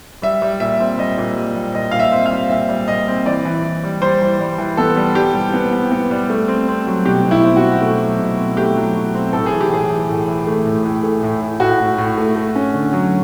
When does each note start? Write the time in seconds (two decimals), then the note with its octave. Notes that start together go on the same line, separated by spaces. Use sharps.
0.22 G3 E5
0.42 G3
0.60 A#2 E5
0.80 C4
0.98 G3 D#5
1.18 A#2
1.36 G3
1.55 G3
1.74 A#2 D#5
1.91 A#2 F5
2.00 E5
2.12 C4
2.26 F5
2.31 G3
2.50 A#2 E5
2.69 G3
2.88 A#2 D#5
3.08 C4
3.26 E3 D5
3.45 E3
3.64 E3
3.84 G3
4.02 G3 C5
4.22 E3
4.40 G3
4.58 E3
4.77 B3 A4
4.96 G3
5.15 G3 G4
5.34 G3
5.54 B3
5.73 B3
5.92 B3
6.11 G3
6.30 A3
6.48 C4
6.68 C4
6.87 F#3
7.05 B2 G4
7.25 B2
7.31 E4
7.44 C4
7.57 F#4
7.63 B2
7.82 A3
8.01 F#3
8.19 B2
8.38 C4
8.57 A3 G4
8.76 F#3
8.95 F#3
9.14 C4
9.33 A2 A4
9.46 G#4
9.51 E3
9.61 G4
9.71 A2 G#4
9.90 E3
10.09 A2
10.28 E3
10.47 A3
10.65 A2
10.84 A2
11.04 A3
11.23 A2
11.42 A2
11.60 A2 F#4
11.80 A2
11.98 A2
12.17 A3
12.36 A3
12.56 C#4
12.74 D3
12.93 F#3